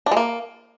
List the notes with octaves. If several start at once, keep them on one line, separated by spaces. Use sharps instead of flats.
D4
G#3
A#3